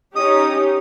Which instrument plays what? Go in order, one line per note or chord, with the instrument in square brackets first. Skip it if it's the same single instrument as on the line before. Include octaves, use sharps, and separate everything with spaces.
[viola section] C#4 D#4 G4 [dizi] D#6